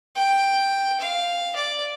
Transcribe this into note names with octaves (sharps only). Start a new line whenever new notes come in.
G5
F5
D5